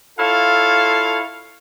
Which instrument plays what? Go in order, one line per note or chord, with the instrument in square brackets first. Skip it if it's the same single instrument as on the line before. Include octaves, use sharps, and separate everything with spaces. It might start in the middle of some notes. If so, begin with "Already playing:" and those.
[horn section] E4 F4 A4 C#5 F5